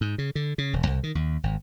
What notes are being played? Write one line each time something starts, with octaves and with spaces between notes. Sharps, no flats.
G#2
C#3
D3
C#3
E1
C2
D#3
D#2
G#1